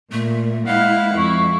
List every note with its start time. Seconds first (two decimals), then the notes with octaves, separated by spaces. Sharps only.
0.12 A#2 A3
0.66 G#3 E4 F5 F#5
1.17 F2 E4 C#6